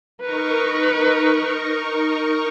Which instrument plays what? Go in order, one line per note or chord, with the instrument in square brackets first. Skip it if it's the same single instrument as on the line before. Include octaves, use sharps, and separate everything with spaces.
[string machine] D#4 A#4 C#6 [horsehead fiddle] B4